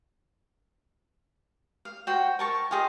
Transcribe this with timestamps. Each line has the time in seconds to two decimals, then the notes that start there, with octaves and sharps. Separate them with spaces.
1.85 F5
2.07 F#4 C5 G5 C6
2.39 A#4 A5 C#6
2.71 F4 G4 G#4 D#5